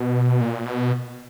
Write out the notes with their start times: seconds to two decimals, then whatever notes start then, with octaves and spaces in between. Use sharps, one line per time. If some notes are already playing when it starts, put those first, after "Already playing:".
Already playing: B2
0.41 A#2
0.66 B2